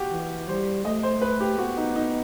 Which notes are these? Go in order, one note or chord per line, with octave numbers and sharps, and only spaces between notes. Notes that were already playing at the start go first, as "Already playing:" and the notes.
Already playing: F#4 G4
E3
G3 C5
A3 D#5
C5
B4
G4
B3 F#4
D#4
D#4